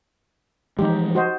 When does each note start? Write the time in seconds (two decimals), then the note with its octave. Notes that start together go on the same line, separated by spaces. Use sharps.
0.79 E3 F3 G#3 D#4 G4
1.15 F#4 C5 D#5